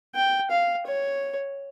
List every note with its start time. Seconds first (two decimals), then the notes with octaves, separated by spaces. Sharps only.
0.15 G5
0.51 F5
0.86 C#5